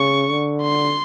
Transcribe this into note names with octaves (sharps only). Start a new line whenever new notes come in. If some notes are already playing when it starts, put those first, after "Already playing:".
Already playing: C#3 C#6
D3
C6